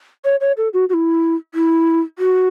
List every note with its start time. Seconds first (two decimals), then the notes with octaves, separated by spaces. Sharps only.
0.25 C#5
0.41 C#5
0.57 A4
0.73 F#4
0.89 F#4
0.94 E4
1.55 E4
2.19 F#4